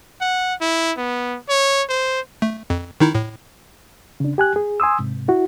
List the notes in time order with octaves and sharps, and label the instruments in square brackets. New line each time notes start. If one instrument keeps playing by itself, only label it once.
[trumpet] F#5
E4
B3
C#5
C5
[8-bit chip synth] A3
F2
D#3 D#4 E4
A2
[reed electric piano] C#3 D4
G4 G#5 F#6
G#4
G#5 C6 D#6 E6
G#2 C3
E4 F#4